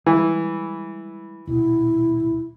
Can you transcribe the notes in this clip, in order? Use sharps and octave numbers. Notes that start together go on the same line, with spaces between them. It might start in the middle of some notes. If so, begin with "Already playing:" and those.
E3 G3 G#3
D#1 B2 E4